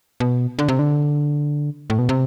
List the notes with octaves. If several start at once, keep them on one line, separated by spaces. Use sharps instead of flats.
B2
D3
C3
D3
A2
B2
C3